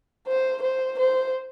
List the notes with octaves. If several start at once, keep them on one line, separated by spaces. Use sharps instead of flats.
C5
C5
C5